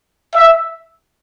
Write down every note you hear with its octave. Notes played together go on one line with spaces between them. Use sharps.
E5